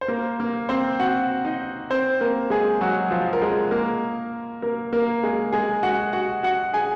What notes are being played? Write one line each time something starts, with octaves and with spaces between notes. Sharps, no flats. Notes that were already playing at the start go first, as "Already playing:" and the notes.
C5
A#3 A#4
A#3 A#4
C4 C5
F#4 F#5
D#4 D#5
C4 C5
A#3 A#4
G#3 G#4
F#3 F#4
F3 F4
A#4
G#3 G#4
A#3 A#4
A#3 A#4
A#3 A#4
G#3 G#4
G#3 G#4
F#4 F#5
F#4 F#5
F#4 F#5
G#4 G#5